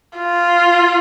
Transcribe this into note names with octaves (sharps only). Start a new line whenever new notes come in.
F4